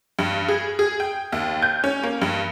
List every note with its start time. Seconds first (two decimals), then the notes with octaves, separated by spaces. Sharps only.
0.19 G2
0.48 G#4
0.79 G#4
1.00 G5
1.32 D#2
1.62 G6
1.84 C#4
2.03 A#3
2.22 G2